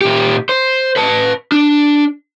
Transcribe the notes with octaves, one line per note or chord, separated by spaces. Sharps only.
A#2 G4
C5
B4 A5
D4